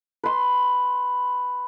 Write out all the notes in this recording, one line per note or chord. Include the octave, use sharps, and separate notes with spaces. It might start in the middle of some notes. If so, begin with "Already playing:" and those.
B4 C6